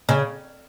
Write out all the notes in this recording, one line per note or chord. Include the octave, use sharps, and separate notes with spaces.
C#3